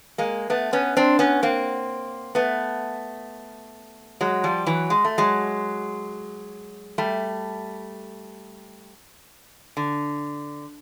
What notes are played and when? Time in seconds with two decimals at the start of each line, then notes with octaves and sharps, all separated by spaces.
0.18 G#3 A#3
0.50 A3 B3
0.73 B3 C#4
0.97 C4 D4
1.19 B3 C#4
1.43 A#3 C4
2.35 A3 B3
4.21 F#3 G#3
4.44 F3 G3
4.67 E3 F#3
4.90 G#3
5.05 A3
5.18 F#3 G#3
6.98 G3 A3
9.77 D3